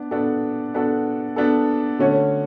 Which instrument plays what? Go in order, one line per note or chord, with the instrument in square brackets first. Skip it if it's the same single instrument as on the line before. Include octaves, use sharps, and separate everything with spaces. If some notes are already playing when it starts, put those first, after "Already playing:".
Already playing: [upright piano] B3 D4
B3 D4 F#4 A4
B3 D4 F#4 A4
B3 D4 F#4 A4
D3 A3 C#4 F#4 C#5